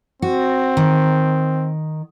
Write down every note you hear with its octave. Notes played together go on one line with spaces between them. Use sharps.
C4 F#4
D#3